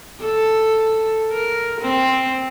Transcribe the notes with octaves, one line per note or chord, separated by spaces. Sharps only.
A4
A#4
C4